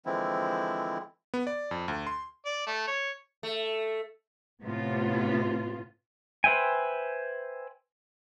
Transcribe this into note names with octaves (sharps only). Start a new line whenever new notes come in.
D3 E3 F3 G#3 C4 E4
B3
D5
F2
D2
C6
D5
A3
C#5
A3
A2 C3 B3 F4
B4 C5 E5 G5 G#5